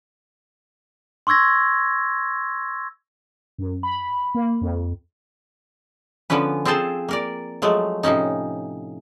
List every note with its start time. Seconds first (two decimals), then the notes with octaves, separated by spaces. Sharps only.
1.27 C6 C#6 E6 G#6 A#6
3.58 F#2
3.83 B5
4.35 A#3
4.61 F2
6.30 D3 F3 B3 C#4 B4
6.65 C4 F4 G#4 A4 C5 A5
7.09 A#3 A#4 D5
7.62 F3 F#3 G#3 A3
8.03 A2 C3 F3 C#4 D#4